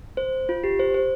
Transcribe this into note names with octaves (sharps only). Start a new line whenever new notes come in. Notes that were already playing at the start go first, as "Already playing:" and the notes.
C5
F4
G4
C5
C5